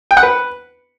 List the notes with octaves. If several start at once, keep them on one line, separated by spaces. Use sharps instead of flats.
G5
F#5
B4